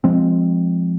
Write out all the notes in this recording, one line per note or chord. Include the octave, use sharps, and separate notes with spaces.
F3 G#3 C4